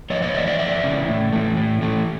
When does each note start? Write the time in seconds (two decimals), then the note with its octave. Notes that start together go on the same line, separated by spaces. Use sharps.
0.10 F2 C#5 D#5
0.22 C#5 D#5
0.35 C#3 D5 E5
0.38 E3
0.46 D5 E5
0.59 F2 D5 E5
0.83 C#3 E3
1.08 A2
1.33 E3 A3
1.57 A2
1.82 E3 A3